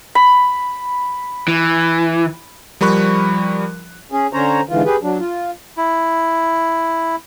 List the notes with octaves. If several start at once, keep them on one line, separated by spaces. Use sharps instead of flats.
B5
E3
F3 G3 A#4 B5 C#6 F#6
C#4 G#4
D3 C#4 C5 C#5 A#5
G#2 D3 E3 F4
G4 G#4 B4
F#3 D4
F4
E4